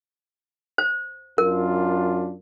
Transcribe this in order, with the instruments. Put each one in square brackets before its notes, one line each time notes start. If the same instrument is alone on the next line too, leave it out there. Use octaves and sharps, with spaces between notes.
[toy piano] C5
[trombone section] F#2 D4 F4 [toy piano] A#4